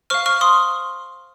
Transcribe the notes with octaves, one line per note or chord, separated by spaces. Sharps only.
C5 F5 C#6 F6
C#6 F6
C6 D#6